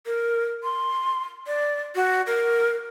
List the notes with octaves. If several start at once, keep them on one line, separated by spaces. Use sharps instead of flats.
A#4
C6
D5
F#4
A#4